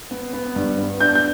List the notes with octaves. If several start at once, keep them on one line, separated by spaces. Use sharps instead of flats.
B3
B3
G2
B3
D4 G6
G6